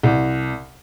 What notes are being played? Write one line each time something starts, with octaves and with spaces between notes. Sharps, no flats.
C2